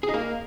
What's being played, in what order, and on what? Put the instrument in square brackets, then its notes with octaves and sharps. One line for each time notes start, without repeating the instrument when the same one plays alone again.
[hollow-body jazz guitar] G#4
D#4
A#3